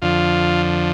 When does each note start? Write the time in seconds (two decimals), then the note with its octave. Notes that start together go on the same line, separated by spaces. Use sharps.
0.02 F2 D3 F3 F4